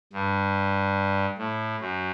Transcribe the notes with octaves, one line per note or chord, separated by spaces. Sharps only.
G2
A2
F#2